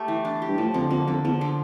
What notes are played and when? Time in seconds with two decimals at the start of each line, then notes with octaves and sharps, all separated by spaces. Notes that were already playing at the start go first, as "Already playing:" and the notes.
Already playing: A3 G4
0.08 E3
0.25 D4
0.42 G4
0.48 G2
0.58 A2 F3
0.74 F2 D3
0.91 F2 A#3
1.07 F2 D3
1.24 E2 F3
1.41 D3